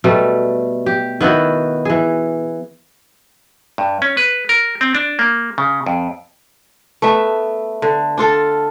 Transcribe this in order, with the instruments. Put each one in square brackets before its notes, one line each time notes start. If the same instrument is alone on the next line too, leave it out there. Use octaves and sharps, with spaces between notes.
[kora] B2 G3 A3
G4
D#3 B3 E4 F#4
E3 G#4
[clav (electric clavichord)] G2
C#4
B4
A#4
C4
D4
A#3
C#3
F2
[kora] A3 B3 E5
D3
D4 F4 A4